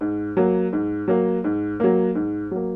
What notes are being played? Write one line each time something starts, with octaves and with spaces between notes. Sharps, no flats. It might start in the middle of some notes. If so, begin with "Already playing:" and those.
G#2
F#3 A#3
G#2
F#3 A#3
G#2
F#3 A#3
G#2
F#3 A#3